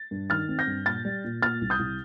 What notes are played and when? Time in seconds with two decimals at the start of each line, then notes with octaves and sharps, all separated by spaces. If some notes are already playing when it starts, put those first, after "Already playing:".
Already playing: A6
0.11 G2
0.30 D#3 F6 A6
0.49 C4
0.59 G6 A#6
0.67 G2
0.86 A#2 F6 A6
1.05 G3
1.24 A#2
1.42 A#2 F6 A6
1.61 C2
1.70 D#6 G6
1.79 C2